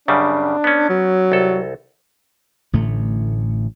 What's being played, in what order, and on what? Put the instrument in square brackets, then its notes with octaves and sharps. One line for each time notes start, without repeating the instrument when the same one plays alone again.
[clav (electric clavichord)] F#2 C#3 G3 [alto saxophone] D4
[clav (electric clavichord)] B3 C#4
[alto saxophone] F#3
[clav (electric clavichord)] C2 A4
[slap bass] A1 A2 D3 A3